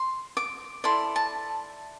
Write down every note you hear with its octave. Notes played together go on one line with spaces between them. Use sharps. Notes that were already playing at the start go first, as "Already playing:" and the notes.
Already playing: C6
D6
E4 A4 D5 C6
A5